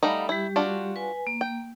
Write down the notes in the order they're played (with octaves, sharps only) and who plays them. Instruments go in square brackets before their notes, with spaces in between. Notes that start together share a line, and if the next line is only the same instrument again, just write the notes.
[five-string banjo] G3 A3 D#4 [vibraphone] F5 F#5 B5
[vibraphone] G3 G4 [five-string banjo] E4
[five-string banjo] D4 F4 F#4
[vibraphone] B4 G#5
A#3
[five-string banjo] G5